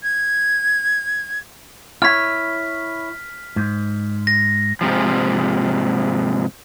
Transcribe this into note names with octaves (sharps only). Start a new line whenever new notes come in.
G#6
E4 C#5 F6 B6
G#2
A#6
G#2 C3 F3